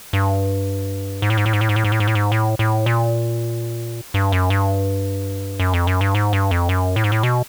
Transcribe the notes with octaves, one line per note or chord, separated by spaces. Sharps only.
G2
G#2
A2
G#2
A2
G#2
A2
G#2
A2
G#2
A2
G#2
A2
G#2
A2
A2
A#2
G2
F#2
G2
F#2
F2
F#2
G2
G#2
G2
F2
F#2
A2
G#2
A2
B2